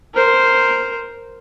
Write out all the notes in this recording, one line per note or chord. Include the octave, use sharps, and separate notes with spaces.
A#4 C5